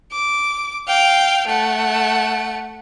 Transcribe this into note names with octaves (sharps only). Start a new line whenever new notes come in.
D6
F5 G5
A3 F#5